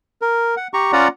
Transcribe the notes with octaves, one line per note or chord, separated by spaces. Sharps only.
A#4
F#5
G4 A#5 C#6
C#4 F4 D5 F#5 A#5